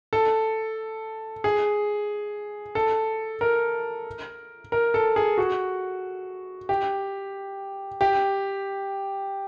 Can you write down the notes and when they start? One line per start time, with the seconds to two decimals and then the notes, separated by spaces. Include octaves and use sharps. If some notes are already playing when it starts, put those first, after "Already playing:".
0.13 A4
1.44 G#4
2.75 A4
3.41 A#4
4.72 A#4
4.94 A4
5.16 G#4
5.38 F#4
6.69 G4
8.01 G4